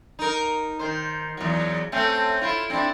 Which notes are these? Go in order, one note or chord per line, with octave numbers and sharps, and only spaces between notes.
D#4 A#4
D#3 C5
E2 F#3
A3 C4 C#4
E4 F4
C4 D4 E4